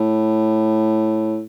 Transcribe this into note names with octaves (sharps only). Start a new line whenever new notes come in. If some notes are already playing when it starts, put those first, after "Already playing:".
Already playing: A2